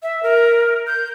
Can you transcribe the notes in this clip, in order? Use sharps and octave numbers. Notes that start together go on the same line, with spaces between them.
E5
A#4
G6